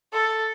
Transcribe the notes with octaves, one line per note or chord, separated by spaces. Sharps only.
A4